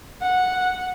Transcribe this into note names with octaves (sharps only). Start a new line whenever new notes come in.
F#5